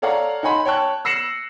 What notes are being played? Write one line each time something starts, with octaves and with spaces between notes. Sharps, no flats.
A4 C#5 D5 F5 F#5 A#5
D#4 C#5 F#5 G#5 B5 C6
C#5 G5 A5 C#6 F#6
E6 A#6 C7 C#7 E7 F#7